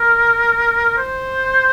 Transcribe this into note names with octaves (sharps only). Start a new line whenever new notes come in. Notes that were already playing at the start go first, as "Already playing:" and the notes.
Already playing: A#4
C5